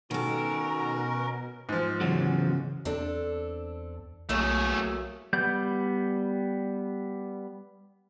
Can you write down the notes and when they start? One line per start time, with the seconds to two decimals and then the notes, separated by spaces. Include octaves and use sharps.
0.11 B2 D#3 C#4 F#4 A4 A#4
1.69 G#2 F3
2.01 E2 C#3 F#3
2.85 E2 C4 D4 A4
4.29 B1 A2 F#3 A3 A#3 G#4
5.33 G3 B3 G6